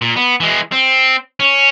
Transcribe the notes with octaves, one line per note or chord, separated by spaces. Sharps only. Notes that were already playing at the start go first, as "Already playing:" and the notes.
A#2
B3
E3 G#3
C4
C#4